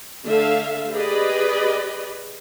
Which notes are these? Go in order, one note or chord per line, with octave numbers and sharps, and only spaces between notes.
D3 A3 A4 E5 F5
G4 G#4 B4 D5 D#5 B5